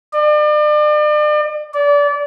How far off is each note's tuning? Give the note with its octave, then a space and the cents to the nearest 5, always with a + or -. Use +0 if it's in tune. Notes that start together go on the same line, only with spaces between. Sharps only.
D5 +40
D5 -25